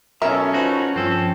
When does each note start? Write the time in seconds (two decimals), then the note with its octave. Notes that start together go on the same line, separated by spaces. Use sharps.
0.22 B2 F#3 C#4 A4 A#4 E5
0.54 D#4 F4 F#4 B4 C5
0.96 G2 F3 C4 C#4 A4